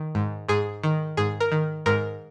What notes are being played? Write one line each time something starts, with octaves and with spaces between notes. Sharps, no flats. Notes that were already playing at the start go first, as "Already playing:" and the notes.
Already playing: D#3
G#2
G#2 G#4
D#3
G#2 G#4
A#4
D#3
G#2 A#4